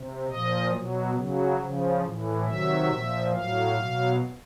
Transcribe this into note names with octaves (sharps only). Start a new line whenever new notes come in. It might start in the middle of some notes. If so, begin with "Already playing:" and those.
Already playing: C3
A#2 F3 D#5
B2 F#3
C#3 F#3
C#3 F3
A2 E3
C3 D#3 F#3 E5
A#2 F3
A2 F#3 F5
B2 F#3